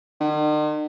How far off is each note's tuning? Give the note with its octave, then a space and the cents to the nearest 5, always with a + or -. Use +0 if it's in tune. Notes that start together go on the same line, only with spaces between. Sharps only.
D#3 -45